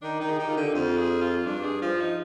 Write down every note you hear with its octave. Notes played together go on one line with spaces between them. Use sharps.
D#3 D4
D#3 D#4
G#4
D#3 G4
F4
D3 G4
D#4
F2 F4
G#4
F4
G2 D4
G#4
F3 F4
D#4